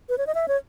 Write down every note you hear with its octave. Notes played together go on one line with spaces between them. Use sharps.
B4
C#5
D#5
E5
C#5